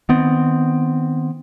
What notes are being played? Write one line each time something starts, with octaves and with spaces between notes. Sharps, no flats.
D#3 B3 C4